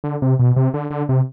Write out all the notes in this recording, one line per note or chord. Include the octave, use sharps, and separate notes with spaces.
D3
C3
B2
C3
D3
D3
C3